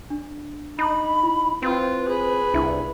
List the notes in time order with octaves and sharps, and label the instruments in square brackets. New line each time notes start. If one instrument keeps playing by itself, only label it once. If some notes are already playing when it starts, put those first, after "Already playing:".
[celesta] D4
[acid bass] D#4 [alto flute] B5
[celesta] E4
[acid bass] C4 [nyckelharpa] F4 [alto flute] B4
[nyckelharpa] G#4 B5
[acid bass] C2 [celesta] D4 E4 E5